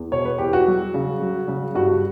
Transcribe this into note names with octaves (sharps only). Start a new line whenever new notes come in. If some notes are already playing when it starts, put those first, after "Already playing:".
Already playing: E2
B2 C#5
B4
E2 G4
F#4
F#3
C#3
F#3
C#3
G2 F#4